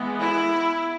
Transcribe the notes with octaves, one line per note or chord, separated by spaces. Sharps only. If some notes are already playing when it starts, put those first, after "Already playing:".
Already playing: E3 G#3 B3
E4